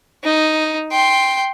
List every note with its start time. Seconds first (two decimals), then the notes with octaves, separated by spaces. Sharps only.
0.23 D#4
0.91 G5 C6